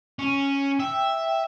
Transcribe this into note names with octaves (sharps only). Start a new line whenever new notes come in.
C#4
E5 G5